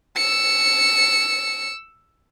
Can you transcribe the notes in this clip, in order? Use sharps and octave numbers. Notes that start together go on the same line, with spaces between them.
E6 C#7